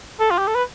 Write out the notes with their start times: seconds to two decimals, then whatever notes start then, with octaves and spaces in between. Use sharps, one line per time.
0.20 A4
0.31 F4
0.39 G4
0.48 A4
0.55 B4